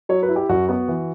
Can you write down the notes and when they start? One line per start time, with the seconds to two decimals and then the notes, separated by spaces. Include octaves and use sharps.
0.09 F#3 C#5
0.23 B4
0.29 E4
0.36 G4
0.49 F#2 F#4
0.69 B3 F#4
0.88 E3